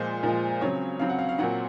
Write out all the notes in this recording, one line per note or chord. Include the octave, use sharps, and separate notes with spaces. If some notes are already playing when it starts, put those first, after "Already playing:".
Already playing: A#2 F3 G#3 C5
A#2 F3 G#3
C#3 F#3 C4 C#5
C#3 F#3 C4 F5
F#5
F5
F5
A#2 F#3 C4 F#5